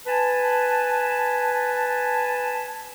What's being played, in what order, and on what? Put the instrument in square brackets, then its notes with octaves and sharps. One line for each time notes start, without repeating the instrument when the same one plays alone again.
[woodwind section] B4 G#5 A5